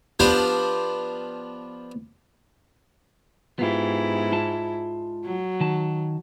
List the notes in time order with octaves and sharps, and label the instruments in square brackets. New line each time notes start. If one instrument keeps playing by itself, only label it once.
[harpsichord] F3 B3 D4 F4 G4 C5
[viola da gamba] G#2 E4 [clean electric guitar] B3 F4 G4
[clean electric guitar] G#3 F4 A5
[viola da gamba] F#3
[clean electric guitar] D#3 A5